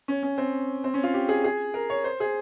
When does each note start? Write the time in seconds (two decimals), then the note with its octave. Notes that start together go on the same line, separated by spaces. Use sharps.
0.08 C#4
0.23 C#4
0.38 C4
0.84 C4
0.94 C#4
1.03 F4
1.14 G4
1.29 G#4
1.44 G#4
1.74 A#4
1.90 C#5
2.04 C5
2.20 G#4